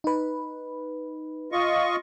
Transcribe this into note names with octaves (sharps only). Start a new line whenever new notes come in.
D#4 B4
F4 D#5 C#6